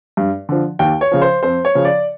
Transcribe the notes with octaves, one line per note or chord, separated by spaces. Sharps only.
G2
D3 F3
D#2 G5
C#5
C#3 F3
C5
F2 C5
C#5
C#3 F3
D5